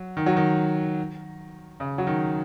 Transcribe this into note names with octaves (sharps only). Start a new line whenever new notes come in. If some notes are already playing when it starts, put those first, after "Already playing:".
Already playing: F#3
D#3
F#3
D#3
C#3
F#3
D#3